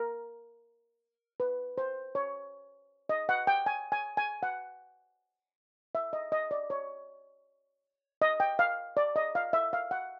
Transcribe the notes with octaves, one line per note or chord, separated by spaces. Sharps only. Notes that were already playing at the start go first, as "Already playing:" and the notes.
Already playing: A#4
B4
C5
C#5
D#5
F#5
G5
G#5
G#5
G#5
F#5
E5
D#5
D#5
D5
C#5
D#5
G5
F5
D5
D#5
F5
E5
F5
F#5